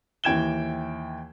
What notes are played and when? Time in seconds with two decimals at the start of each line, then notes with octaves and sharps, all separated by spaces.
0.24 D#2 E3 G5 G#6 E7 G7